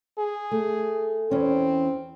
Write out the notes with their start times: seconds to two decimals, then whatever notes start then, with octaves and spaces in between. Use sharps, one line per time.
0.18 G#4
0.51 A3
1.31 E2 C4 C#4